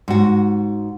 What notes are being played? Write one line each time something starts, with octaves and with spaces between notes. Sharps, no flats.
G#2 F#4